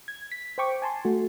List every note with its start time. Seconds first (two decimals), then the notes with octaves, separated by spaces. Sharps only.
0.08 G#6
0.32 B6
0.58 C5 G5 C#6 D6
0.82 G#5 A5 C6
1.05 A3 F#4